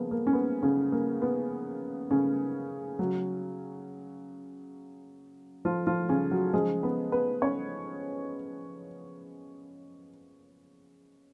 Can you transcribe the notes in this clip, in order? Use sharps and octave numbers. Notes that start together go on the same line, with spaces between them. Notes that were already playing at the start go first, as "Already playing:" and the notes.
Already playing: C#3 F3 A#3 B3
A#3
C#4
B3
C#3 C#4
A#3
B3
C#3 C#4
C#3 F#3
F3 F4
F3 F4
C#3 C#4
F#3 F#4
C#3 F3 G#3 G#4
B3 B4
B3 B4
C#4 C#5